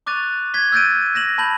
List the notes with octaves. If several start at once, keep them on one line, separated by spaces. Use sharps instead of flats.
C#6 D6 F#6 A6 D#7 F7
G#6 B6 G7
E6 F#6 G6 A6 D7 D#7
G6 A#6 E7 F#7
A5 B5 G6 F#7